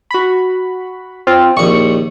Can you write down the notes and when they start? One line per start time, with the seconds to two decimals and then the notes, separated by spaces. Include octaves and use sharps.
0.11 F#4 B5
1.27 C4 F4
1.57 A#1 D#2 C#6 C#7